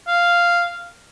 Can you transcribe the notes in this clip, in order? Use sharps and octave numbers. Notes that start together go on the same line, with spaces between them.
F5